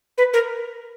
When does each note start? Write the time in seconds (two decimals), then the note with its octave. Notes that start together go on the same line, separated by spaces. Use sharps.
0.18 B4
0.33 A#4